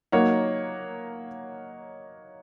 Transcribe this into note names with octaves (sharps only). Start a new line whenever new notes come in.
F#3 A#3 D#4 A#4 C#5 F#5